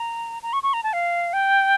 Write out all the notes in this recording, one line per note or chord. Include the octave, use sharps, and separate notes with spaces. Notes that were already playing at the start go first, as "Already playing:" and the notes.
Already playing: A#5
A#5
C#6
C#6
A#5
A5
F5
G5